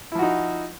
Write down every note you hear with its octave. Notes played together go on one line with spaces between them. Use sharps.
F3 D#4 E4 F#4